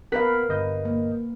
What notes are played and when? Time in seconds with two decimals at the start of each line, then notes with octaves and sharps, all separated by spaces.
0.12 B3 A#4 B4 F5 F#6 B6
0.49 G1 D#5 G6
0.85 A#3